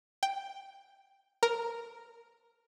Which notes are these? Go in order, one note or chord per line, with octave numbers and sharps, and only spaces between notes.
G5
A#4